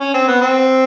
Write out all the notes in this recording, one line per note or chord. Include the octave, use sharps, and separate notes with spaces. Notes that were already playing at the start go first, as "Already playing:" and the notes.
C#4
C4
B3
C4